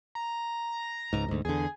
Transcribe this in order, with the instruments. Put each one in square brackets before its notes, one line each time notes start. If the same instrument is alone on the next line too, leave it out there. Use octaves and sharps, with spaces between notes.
[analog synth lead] A#5
[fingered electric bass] C#2 G#2
D2 G#2
[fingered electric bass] E2 D3 [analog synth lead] G#4